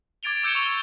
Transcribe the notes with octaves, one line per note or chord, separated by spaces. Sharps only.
D6 G#6 A6 D7 F7 G7
D6 E6 G6 G#6 C#7 E7
C#6 D6 E6 F7
C#6